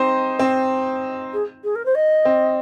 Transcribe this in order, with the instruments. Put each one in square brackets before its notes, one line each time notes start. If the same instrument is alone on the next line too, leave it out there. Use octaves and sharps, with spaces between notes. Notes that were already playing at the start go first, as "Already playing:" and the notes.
Already playing: [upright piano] C4 D#4 C5
C4
[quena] G#4
G#4
A#4
C5
D#5
[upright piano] C4